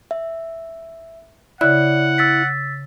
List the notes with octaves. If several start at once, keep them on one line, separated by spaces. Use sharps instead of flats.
E5
C#3 E4 D5 F#5 F#6
E6 A6 B6